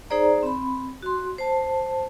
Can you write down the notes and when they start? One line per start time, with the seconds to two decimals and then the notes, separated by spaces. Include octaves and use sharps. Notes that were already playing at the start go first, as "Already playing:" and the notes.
0.10 D#4 G#4 C5 D5 A#5
0.43 C4 B5
1.02 F#4 C6
1.38 C5 A5